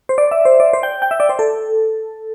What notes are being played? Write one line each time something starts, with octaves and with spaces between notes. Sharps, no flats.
C5
D5
E5
C5
D5
C5
G5
G5
E5
D5
C5
A4